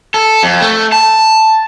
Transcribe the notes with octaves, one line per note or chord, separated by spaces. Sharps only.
A4
F2
A3
A5